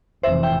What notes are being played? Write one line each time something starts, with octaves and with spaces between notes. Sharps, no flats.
F1 F2 C3 E3 C5 E5
E5 G5